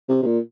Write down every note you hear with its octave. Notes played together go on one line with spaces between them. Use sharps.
C3
C3
A#2